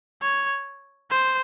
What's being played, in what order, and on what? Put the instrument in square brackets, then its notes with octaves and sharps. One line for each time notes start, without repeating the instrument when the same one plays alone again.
[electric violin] C#5
C5